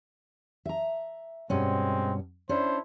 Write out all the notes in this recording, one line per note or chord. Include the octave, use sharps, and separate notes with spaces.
E5 A#5
G2 B2 G#3 C4 C#4
C#4 D4 E4 C5